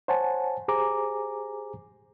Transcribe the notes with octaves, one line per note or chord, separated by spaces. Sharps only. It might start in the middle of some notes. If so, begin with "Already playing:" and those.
C5 C#5 F#5 G#5 A5
G4 G#4 C5 G#5 A#5 D6